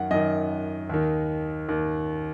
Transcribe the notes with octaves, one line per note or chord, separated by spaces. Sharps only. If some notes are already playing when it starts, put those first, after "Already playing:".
Already playing: F#2 D#3 F#5
F#2 D#3 D#5
D#2 D#3
D#2 D#3